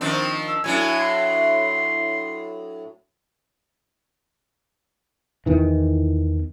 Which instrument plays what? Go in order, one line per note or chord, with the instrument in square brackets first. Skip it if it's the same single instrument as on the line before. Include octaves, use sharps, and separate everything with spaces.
[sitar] D#3 F3 D4 [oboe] C4
[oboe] E6
[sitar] A2 F#3 D4 [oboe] G#5
[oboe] C6
[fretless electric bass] E2 D#3 E3